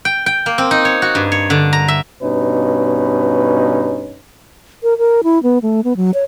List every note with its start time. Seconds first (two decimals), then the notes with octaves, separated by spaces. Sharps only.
0.05 G5
0.26 G5
0.46 A#3
0.58 C4
0.71 D#4
0.85 C#5
1.02 F#4
1.15 G2
1.32 C#5
1.50 D3
1.73 A#5
1.88 E5
2.22 G2 B2 C#4 D#4 B4
4.83 A#4
4.98 A#4
5.24 E4
5.43 B3
5.62 A3
5.84 B3
5.97 F#3
6.14 C#5